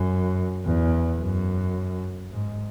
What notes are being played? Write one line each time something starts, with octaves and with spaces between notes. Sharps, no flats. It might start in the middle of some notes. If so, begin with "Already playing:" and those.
Already playing: F#2
E2
F#2
G#2